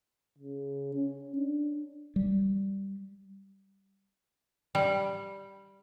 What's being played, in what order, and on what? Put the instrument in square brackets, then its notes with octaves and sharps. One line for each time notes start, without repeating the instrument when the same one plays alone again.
[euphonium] C#3
C#4
D4
[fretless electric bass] G3
[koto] G3